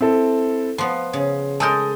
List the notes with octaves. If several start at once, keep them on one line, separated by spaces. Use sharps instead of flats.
C4 E4 A4
F3 B3 C6
C#3
G#3 A4 A#4 A5 D#6 G6